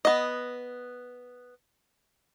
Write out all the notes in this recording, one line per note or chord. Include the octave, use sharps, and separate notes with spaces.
B3 D#5